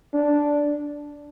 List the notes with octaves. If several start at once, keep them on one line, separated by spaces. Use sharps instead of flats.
D4